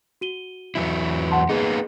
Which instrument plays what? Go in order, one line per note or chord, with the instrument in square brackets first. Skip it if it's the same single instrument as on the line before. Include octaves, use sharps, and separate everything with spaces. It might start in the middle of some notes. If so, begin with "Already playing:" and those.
[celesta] F#4 D#7 G7
[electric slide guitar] E2 F#3 E4
[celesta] F#5 A5 C6
[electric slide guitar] A#3 B3 D#4 [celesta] G#4